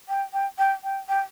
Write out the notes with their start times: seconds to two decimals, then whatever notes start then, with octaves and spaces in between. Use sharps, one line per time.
0.09 G5
0.33 G5
0.58 G5
0.84 G5
1.09 G5